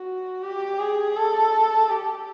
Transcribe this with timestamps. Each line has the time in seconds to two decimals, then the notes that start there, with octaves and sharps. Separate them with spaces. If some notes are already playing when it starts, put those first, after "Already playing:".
Already playing: F#4
0.43 G4
0.79 G#4
1.16 A4
1.89 G4